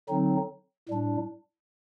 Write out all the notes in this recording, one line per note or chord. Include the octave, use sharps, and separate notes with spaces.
D3 F#3 C4 D#4
A2 G3 D4